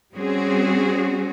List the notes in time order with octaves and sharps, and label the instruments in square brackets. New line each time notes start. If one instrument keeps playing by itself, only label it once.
[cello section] G3 C4 C#4 F#4 G#4